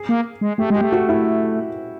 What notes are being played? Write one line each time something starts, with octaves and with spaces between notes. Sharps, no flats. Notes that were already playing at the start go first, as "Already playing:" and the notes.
Already playing: G#4
A#3
G#3
A3 G4
G#3
G4
A3
F#4
E4